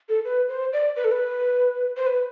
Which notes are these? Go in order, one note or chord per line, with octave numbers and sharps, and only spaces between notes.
A4
B4
C5
D5
B4
A4
B4
C5
B4